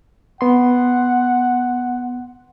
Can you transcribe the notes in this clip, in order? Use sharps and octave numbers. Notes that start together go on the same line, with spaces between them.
B3 F#5 C6